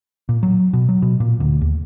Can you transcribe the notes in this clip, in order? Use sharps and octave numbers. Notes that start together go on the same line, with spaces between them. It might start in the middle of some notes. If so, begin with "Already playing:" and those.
A#2
F#3
B2
F#3
B2
A#2
D2
D#2